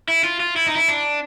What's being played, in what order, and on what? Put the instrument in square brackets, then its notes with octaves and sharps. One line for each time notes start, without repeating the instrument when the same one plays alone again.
[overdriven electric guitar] E4
F4
F4
E4
D#4
E4
D4